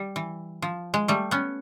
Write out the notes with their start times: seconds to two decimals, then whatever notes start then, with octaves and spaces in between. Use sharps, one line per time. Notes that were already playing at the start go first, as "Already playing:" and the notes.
Already playing: G3
0.16 E3
0.62 F3
0.94 G#3
1.08 G3 A3
1.31 B3 C#4